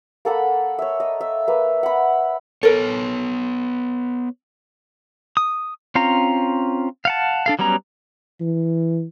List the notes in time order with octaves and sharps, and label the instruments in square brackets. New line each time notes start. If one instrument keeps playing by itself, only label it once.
[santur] A#3 A4 F#5 B5
C#5 E5
D#5
E5
A#3 B4
F#5 B5
[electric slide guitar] B3 C#5 [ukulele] A4 A#4
[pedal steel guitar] D#6
C4 C#4 F4 F5 A#5
F5 F#5 A5
D4 A4 F5
F#3 G3 B3 C#4 A#5
[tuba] E3